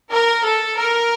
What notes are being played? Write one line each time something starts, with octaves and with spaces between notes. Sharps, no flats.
A#4
A4
A#4